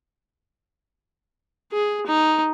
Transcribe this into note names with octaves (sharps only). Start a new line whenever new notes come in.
G#4
D#4